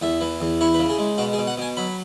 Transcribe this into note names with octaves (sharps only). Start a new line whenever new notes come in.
E2 E5
E3
E2
E4 C#5
B4
C#3
G#4
G#3
B2 F#4
G#4
B2
F#5
B2 G#5
F#3 B5